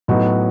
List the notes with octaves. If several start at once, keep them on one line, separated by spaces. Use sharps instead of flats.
A2 F#3 B3 D#4 F#4